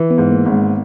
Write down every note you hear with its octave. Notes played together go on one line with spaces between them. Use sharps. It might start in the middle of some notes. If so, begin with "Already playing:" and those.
Already playing: E3
B3
G#2
A#3
G#1
G#3